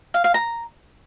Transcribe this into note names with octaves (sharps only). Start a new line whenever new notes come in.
F5
F5
A#5